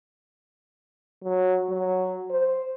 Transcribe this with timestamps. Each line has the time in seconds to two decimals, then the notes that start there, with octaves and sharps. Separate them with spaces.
1.24 F#3
1.70 F#3
2.30 C5